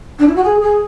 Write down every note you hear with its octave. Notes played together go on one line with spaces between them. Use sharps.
D4
E4
F#4
G#4
G#4